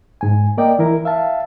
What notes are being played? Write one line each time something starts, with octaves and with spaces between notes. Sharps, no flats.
G#2 G#5
A#3 A#4 D5 D#5 G5
E3 E4 A#4
E5 F5 A5